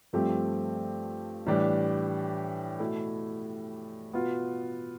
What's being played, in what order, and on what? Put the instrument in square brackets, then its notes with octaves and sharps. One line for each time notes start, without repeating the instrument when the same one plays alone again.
[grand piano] G2 F3 A3 C4 G4
A2 E3 G3 D4 G4
B2 A3 E4
B2 B3 F4